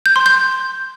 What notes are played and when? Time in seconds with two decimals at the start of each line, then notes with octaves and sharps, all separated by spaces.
0.06 G6
0.16 C6
0.26 G6